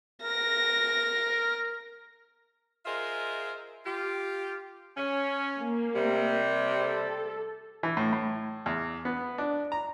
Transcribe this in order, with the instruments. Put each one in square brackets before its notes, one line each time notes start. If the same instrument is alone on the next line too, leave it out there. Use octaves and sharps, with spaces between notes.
[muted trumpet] A#4 [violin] A#6
[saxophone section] F4 G#4 A#4 C5 D#5 E5
F4 G4
C#4
[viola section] A#3
[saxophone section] C3 G3
[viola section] A4
[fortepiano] E3
A2
A2
E2
B3
D4
A#5